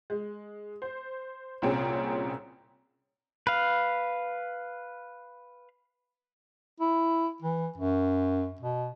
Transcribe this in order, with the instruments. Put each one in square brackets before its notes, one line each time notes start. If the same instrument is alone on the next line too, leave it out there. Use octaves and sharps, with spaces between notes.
[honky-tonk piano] G#3
C5
C2 A#2 C4 C#4 G#4
[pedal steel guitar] B4 F5
[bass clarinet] E4
E3
F#2
B2